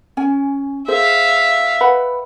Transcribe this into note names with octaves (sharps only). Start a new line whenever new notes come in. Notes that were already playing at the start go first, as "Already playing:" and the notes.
C#4 G#5
G#4 C5 E5 F5
B4 F#5 B5